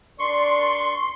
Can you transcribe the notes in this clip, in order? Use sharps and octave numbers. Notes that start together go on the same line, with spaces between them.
D4 A#4 D5 C6 C#6